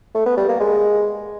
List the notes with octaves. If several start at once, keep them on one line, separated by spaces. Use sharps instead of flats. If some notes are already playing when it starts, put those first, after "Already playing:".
A3
B3
G3
A#3
G#3